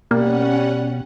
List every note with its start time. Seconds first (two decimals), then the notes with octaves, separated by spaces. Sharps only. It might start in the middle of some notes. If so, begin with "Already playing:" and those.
0.11 B2 G3 A#3 C#4 F#5